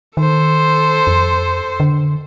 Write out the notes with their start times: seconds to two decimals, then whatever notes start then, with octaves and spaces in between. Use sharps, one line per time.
0.17 D#3 A4 C5
1.07 F2
1.80 D3